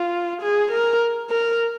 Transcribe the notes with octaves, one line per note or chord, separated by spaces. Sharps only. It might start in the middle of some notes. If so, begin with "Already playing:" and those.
Already playing: F4
G#4
A#4
A#4